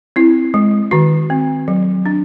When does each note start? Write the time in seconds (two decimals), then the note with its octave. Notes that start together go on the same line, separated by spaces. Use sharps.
0.16 C4 E4
0.54 G#3
0.91 D#3 F#4
1.30 C4
1.68 F#3
2.06 D4